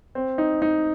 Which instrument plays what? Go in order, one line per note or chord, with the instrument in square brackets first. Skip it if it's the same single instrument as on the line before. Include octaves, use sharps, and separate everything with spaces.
[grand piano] C4
D#4
D#4